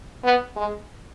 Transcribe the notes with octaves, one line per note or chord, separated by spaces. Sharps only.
B3
G#3